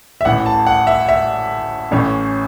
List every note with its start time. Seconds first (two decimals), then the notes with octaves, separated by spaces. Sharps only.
0.21 E5
0.25 A1 A2 E3 F#5
0.46 A5
0.67 F#5
0.87 E5
1.09 E5
1.91 A1 A2 E3 C#4